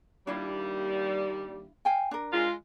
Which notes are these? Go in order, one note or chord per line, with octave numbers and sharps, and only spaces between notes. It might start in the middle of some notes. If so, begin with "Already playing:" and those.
D#2 G3 D4 E4 F4
F5 G5 G#5
D4 A#4
G#3 F4